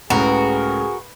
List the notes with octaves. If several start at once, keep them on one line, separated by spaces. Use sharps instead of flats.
C#2 A2 C#3 F#4 G#4 A#4 B4